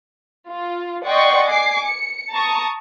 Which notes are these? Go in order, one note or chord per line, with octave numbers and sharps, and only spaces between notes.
F4
D5 D#5 F#5 G5 C6 C#6
G#5 D6 C7
C#7
A5 A#5 C#6 D#6